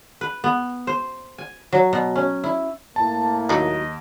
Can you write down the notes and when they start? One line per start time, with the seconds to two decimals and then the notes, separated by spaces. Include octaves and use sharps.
0.21 B4
0.44 B3
0.87 C5
1.38 G#5
1.72 F#3
1.93 B2
2.15 C#4
2.44 E4
2.96 A2 A#3 A5
3.49 D#2 F#3 D#4 D#5